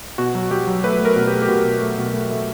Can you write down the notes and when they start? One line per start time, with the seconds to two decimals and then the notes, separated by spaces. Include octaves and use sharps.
0.18 B2 F#4
0.35 F#3
0.51 F#3 G4
0.67 F#3
0.84 A3 B4
1.00 A3
1.05 A#4
1.16 B2
1.27 A3 G4
1.42 G4
1.49 B2 F#4
1.65 B2
1.81 A3
1.98 B2
2.14 A3
2.30 A3